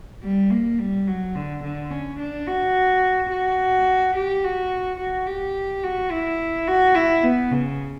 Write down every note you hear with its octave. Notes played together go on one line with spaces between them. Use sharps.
G3
A#3
G3
F#3
D3
D3
C#4
D4
F#4
F#4
G4
F#4
F#4
G4
F#4
E4
F#4
E4
B3
C#3